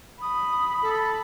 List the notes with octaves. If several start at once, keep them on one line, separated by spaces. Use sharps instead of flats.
B5 D#6
A4